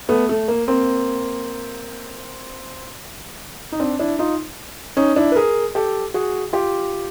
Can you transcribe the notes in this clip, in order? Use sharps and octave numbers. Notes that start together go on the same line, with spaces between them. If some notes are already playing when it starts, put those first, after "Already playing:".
A3 B3
A3
A#3
A#3 C4
D#4
C4 D4
D4 E4
D#4 F4
C#4 D#4
D4 E4
B4
G#4 A#4
G4 A4
F#4 G#4
F4 G4